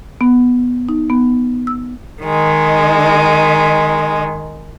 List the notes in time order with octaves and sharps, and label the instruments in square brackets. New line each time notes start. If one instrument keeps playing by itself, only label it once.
[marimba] B3
D#4
B3
E6
[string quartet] D#3 G#3